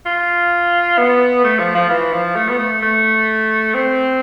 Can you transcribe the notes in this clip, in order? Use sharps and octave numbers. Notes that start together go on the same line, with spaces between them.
F4
B3
A3
F3
F3
E3
F3
A3
B3
A3
A3
C4